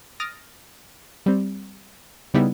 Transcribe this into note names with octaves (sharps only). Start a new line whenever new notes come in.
D#6 F6 A6 A#6 D7
G3 C4
C#3 G3 B3 D#4 E4